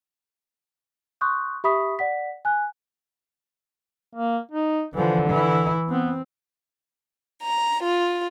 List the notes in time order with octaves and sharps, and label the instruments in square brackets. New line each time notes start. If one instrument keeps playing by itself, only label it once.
[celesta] C6 C#6 D#6 F#6 G6
G4 E5 B5 C#6 D#6 B6
D5 F#5 B6
G#5 F#6
[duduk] A#3
D#4
[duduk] D3 [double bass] E3 F3
[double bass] E3 E4
[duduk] B3 [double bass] C4
[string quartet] A#5
F4